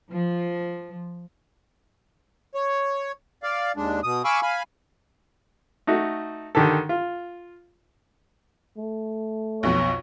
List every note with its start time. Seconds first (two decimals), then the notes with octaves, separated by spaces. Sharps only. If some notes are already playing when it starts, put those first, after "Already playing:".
0.12 F3
2.55 C#5
3.43 D5 F5
3.77 D#2 G#3 D4
4.03 B2 D#6
4.25 F5 G#5 B5 C#6 D6 E6
4.42 F5 G#5 B5
5.87 A3 D#4 F#4
6.55 D3 D#3 G4 A4
6.89 F4
8.78 A3
9.63 B1 F2 B2 C#5